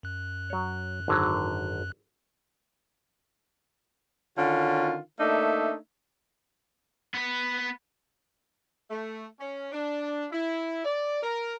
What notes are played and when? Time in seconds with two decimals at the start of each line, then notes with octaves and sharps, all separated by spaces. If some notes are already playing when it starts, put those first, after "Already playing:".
0.03 F#2 F#6
0.50 F#3 C#5
1.08 G#1 D3 F#3
4.38 D3 D#3 C#4 F4 F#4
5.20 A3 A#3 D4 D#4 E5
7.14 B3 B4
8.90 A3
9.39 C#4
9.72 D4
10.31 E4
10.84 D5
11.23 A#4